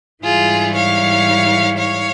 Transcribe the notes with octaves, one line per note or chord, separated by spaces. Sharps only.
G#2 E3 G3 F4 G#4
C#5 F5
C#5 F5